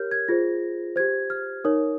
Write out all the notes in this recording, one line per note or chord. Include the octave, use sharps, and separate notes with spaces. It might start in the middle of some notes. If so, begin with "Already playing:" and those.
Already playing: G4 A#4 C#5 F6 G6
G#6
F4 G#4 C5 A#6
G4 C5 G#6
F6
D#4 A#4 C#5 D#6